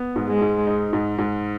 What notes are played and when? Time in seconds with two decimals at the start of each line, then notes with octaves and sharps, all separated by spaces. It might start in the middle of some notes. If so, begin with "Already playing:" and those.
Already playing: B3
0.16 G#2
0.29 G#3
0.41 G#2
0.67 D#4
0.93 G#2
1.18 G#2